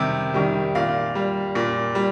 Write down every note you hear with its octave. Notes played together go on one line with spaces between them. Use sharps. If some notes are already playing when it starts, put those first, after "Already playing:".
Already playing: C3 D#3 G3
D#3 G3
A#2 F5
G3
A#2
G3